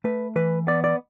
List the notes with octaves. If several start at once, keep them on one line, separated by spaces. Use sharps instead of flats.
A3 B4
E3 B4
B3 D5
D5